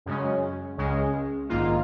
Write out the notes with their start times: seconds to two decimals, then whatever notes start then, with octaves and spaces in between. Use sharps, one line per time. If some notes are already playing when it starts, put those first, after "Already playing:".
0.06 F#2 C#3 G#3 C#4
0.77 C#2 C#3 G#3 C#4
1.49 A#1 G#2 D#3 A#3 F4